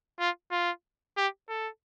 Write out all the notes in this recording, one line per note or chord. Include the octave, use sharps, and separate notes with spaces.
F4
F4
G4
A4